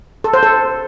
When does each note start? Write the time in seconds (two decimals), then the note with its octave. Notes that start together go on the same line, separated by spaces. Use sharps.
0.24 A4
0.34 C5
0.43 A4